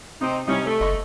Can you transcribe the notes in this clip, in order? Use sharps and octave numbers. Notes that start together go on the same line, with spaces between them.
C3 C4 D#4
C3 G3 C#4 D#4 E4
A3
F#1 D#5 C#6